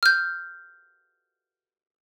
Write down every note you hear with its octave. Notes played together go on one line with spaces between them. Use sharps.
F6 G6